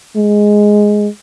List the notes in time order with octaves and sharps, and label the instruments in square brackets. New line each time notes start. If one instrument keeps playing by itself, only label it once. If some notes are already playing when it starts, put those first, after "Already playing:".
[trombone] G#3